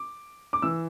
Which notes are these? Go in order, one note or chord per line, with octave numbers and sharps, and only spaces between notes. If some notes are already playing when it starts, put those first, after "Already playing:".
Already playing: D6
D6
E3 E6